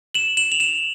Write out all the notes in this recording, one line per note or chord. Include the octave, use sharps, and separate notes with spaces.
E7 F#7
E7 F#7
F7
E7 F#7